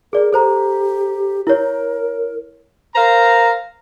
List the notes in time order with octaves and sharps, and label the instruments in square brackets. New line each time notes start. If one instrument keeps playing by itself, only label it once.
[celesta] G#4 D5 [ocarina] A#4
[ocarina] G4 [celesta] A4 C5 A#5
[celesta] E4 C#5 [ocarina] A#4
[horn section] A#4 C5 F5 A#5